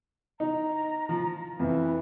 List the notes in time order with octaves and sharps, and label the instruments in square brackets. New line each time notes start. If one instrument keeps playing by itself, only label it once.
[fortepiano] D#4 [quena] A#5
[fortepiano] F3
[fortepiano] F2 [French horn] E3 [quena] B4